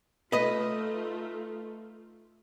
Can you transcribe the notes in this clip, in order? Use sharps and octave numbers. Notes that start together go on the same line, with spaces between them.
A3 D#4 F4 B4 D#5